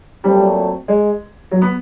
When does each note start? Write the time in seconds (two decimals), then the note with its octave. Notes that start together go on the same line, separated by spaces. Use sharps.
0.24 A#2 F#3 G3 A3 C4
0.88 G#3
1.51 F#3
1.62 B3